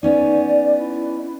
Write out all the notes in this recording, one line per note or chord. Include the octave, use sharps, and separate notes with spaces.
B3 C#4 D#4 D5
E4